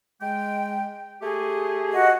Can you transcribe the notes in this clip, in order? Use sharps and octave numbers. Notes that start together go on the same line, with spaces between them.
G#3 G5
A3 G4 G#4
F#4 D#5